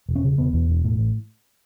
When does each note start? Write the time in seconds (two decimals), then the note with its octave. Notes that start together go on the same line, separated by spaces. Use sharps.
0.09 E1
0.15 C#4
0.24 C#3
0.38 E1 B3
0.54 E2
0.69 E1
0.85 A2
0.99 A1